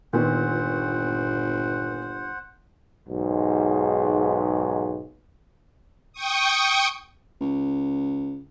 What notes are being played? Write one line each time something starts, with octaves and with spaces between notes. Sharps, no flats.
G1 A#2 D#3 B3 C5 F#5
B1 G#2
G5 C#6 D#6
C#2